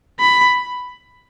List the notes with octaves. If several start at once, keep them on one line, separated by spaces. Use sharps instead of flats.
B5